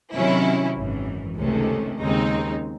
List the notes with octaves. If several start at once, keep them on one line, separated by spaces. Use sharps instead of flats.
C3 D#3 F#3 C#4 E4
G#1 F#2 E3
C#2 C3 D#3 A3 C#4
D#2 C#3 G#3 C4 D#4